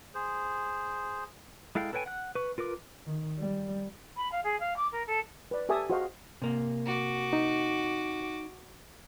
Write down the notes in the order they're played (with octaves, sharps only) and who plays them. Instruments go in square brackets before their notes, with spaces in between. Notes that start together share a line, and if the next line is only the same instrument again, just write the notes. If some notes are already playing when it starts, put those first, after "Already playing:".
[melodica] G#4 C5
[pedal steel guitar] G#3 E4 A4 F5 G5
A4 B4 C#5 G5 G#5
F#5 F#6
B4 C#6
F4 A#4 B4 D6
[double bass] D#3
G3
[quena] B5
F5
G#4
F5
D6
A#4
A4
[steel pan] B4 D5
G4 A4 E5 G#5 A5 D#6
F#4 G#4 C5 D#5 F5
[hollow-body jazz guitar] C3 A#3
[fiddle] F#4 D6
[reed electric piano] D#4